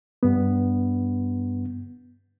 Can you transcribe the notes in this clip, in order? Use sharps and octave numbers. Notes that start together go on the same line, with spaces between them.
G2 B3